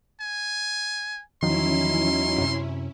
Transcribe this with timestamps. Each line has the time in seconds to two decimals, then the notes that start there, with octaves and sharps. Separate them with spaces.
0.20 G#5
1.42 E2 D#3 F3 F#3 C#4 D#4 E4 C6
2.38 F#2 C3